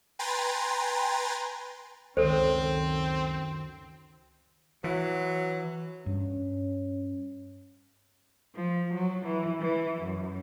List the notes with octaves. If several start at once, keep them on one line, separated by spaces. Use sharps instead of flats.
B4 G5 G#5 A#5 C6 A6
C#2 F#2 D#3 C4 A4 C5
E3 F#3
G2 C#4
F3
F#3
E3
E3
F#2